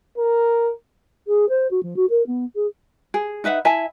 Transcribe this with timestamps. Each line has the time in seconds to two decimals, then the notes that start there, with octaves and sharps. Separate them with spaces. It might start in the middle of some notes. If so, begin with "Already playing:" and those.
0.18 A#4
1.27 G#4
1.49 C5
1.71 F#4
1.83 F3
1.96 F#4
2.09 A#4
2.27 B3
2.55 G#4
3.14 G#4
3.44 D#4 B4 E5 F#5
3.65 E4 E5 G#5 A5